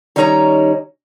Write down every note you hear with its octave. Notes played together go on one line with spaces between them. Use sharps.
D#3 G3 C#4 D#4 C#5 A#5